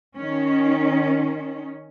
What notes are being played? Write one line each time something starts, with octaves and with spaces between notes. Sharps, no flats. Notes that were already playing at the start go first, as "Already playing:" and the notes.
D#3 C#4